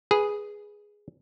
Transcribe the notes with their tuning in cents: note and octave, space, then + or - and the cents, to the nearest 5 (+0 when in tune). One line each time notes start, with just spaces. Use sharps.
G#4 +0 B4 -10